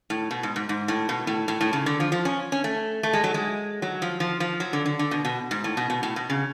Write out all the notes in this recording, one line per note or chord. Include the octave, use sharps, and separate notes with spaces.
A2
B2
G#2
G#2
G#2
A2
B2
A2
A2
A2
C#3
D3
F3
F3
C#4
C#4
A3
A3
G#3
F#3
G#3
F#3
F3
F3
F3
F#3
D3
D3
D3
B2
B2
G#2
A2
B2
B2
A2
B2
C#3